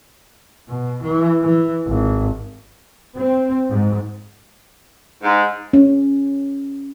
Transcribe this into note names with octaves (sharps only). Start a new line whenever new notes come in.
B2
E3
E3
G#1
C4
G#2
G#2
C#4